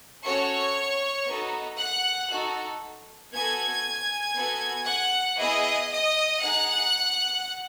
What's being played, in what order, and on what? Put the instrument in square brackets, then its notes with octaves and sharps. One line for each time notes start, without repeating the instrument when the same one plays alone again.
[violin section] C#4 F#4 A4 C#5 C#6
B3 D#4 F#4 A4
F#5 F#6
D#4 F#4 A4
B3 F#4 A4 G#5 G#6
B3 F#4 A4
F#5 F#6
B3 E4 G#4 D#5 D#6
D#5 D#6
D#4 G#4 F#5 F#6